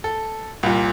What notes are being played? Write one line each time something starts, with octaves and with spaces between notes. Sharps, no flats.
A4
C2 A#2